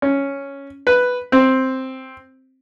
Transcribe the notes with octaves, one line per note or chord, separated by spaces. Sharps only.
C#4
B4
C4